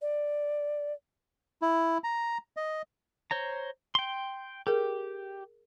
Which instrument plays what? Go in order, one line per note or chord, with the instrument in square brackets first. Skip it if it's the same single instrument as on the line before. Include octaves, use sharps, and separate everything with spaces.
[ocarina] D5
[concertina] E4
A#5
D#5
[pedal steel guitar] C5 C#5 A#5
G5 C6
[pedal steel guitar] G4 [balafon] G#4 A#4